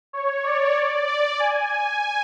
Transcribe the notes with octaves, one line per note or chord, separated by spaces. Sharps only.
C#5
D5
D5
G#5